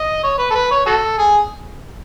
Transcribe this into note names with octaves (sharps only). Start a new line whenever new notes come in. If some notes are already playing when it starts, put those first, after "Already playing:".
Already playing: D#5
C#5
B4
A4
B4
C#5
F#4 A4
G#4